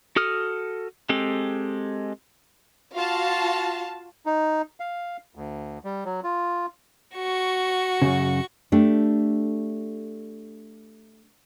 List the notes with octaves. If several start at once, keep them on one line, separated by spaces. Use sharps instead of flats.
F#4 A4 D#6 F6
G#3 C4 G4 A4
F4 F#4 F5 A5
D#4
F5
D2
G3
F#3
F4
F#4 C#6
F#2 A2 C#3
A3 D4 G4